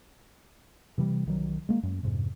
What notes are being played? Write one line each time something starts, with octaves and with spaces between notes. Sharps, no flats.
C3 E3 F#3 G3
B1 D#3 F#3
G#3 A#3
F#2
F2 G#2 C3